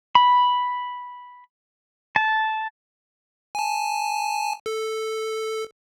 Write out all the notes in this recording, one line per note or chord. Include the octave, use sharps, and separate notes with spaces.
B5
A5
G#5 A5
A4